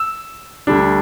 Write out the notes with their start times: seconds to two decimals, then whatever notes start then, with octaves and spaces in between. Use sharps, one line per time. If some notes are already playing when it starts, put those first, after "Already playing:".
Already playing: E6
0.67 D2 D3 G3 D4